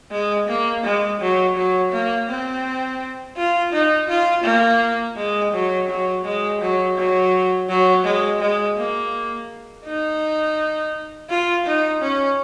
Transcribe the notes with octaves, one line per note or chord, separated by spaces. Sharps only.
G#3
A#3
G#3
F#3
F#3
A#3
C4
F4
D#4
F4
A#3
G#3
F#3
F#3
G#3
F#3
F#3
F#3
G#3
G#3
A#3
D#4
F4
D#4
C#4